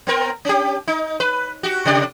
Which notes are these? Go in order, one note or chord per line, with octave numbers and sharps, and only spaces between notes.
B3 C4 A#4
C#4 G4
D#4
B4
F#4 G4
C3 G4 D5